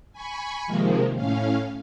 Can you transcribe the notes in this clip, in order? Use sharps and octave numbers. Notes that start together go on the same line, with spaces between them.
G#5 B5 C#6
C3 D#3 F3 G#3 A#3
A2 C#4 F5